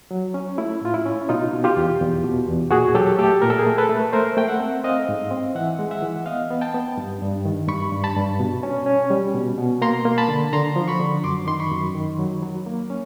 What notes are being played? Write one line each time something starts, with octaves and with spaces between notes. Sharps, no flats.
F#3
C#4
A3 E4
A2 F4
E4
C#4
B2 D#4 F4
B2
F4 G4
E2
E2
B2
E2
A#2 F#4 G#4
F#3 G4 A4
A3 G4 A4
A#2 A#4
A4
G#4 A#4
A3
A4 B4
A3
A3 A#4 C5
A3 G5
E5 F#5
C4
C4 D#5 F5
G#2
C4
E3 E5 F#5
G#3
E5 F#5
E3
B3 D#5 F5
B3
G5 A5
B3
G2
G2
D#3
G2 B5 C#6
G2
A5 B5
G2
B2
C#4
C#4
G3
B2
B2
A#3 A#5 C6
A#3
A5 B5
D3
D3 A#5 C6
F3
B5 C#6
D3
F#2 C6 D6
D#3 C6
B5 C#6
F#2
D#3
F#3
F#3
A#3
C#4